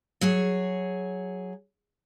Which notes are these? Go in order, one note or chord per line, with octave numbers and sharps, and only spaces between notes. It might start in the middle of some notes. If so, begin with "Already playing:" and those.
F#3 G#4 C#5